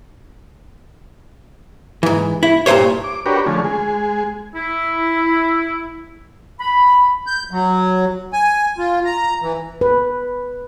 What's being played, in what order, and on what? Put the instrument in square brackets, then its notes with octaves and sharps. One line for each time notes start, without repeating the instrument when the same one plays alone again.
[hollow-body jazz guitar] G#2 E3
E4
G2 A#2 F#3 C5 C#5
[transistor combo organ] D6
D4 F#4 G4 A#4 B4 C#5
D3 F3 A3 C#4 G#4
G#3 G#4
[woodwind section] E4
B5
[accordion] G6
F#3
G#5
F4
A#5
E3
[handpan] B4